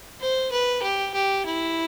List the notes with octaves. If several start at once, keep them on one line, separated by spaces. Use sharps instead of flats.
C5
B4
G4
G4
E4